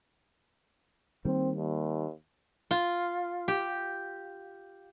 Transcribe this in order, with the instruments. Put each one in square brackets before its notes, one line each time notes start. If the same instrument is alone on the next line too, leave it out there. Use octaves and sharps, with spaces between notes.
[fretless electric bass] D#3 G3 A#3 [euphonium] C4
[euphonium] D#2
[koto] F4
G4